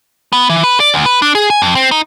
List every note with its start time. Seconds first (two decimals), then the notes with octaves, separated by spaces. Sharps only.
0.33 B3
0.49 E3
0.64 B4
0.80 D5
0.94 D2
1.06 B4
1.22 D4
1.35 G#4
1.50 G#5
1.62 F2
1.75 C4
1.91 D#4